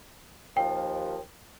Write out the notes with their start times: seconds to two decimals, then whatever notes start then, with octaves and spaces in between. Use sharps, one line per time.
0.57 D#2 F3 G5